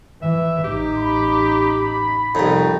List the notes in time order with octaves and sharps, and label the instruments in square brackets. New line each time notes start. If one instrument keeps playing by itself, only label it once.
[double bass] E3 [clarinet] E5
[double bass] A1 D#4 [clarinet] G4
[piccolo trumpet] B5
[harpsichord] C2 F2 [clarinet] D#4